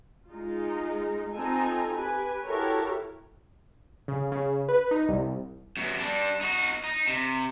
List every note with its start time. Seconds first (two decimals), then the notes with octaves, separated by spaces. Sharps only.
0.29 G#3 D#4 F4
1.34 C4 D#4 F4 A4 G#5 A#5
1.94 G4 B4 G#5
2.44 E4 F#4 G4 A4 A#4 C#5
4.08 C#3
4.32 C#3
4.69 B4
4.91 D#4
5.09 C2
5.77 F#2 B2
6.00 G3 D4
6.41 D#4 F#4
6.84 D#4
7.08 C3